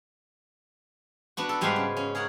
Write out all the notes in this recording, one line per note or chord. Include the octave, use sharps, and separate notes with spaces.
B3 D4 F#4
A4
G#2 G3 G#3 D4 B4 F5
C#3
C#4
G#4 A#4 C#5 F#5